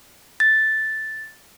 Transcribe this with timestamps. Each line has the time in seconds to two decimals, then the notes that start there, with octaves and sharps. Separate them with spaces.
0.40 A6